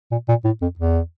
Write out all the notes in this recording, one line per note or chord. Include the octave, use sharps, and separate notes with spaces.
A#2
A#2
A2
F2
E2